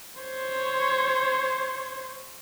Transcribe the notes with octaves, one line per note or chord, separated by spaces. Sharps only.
C5 C#5